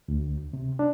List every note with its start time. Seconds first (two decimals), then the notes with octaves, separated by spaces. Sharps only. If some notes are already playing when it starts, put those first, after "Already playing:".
0.08 D2
0.53 C3
0.79 D4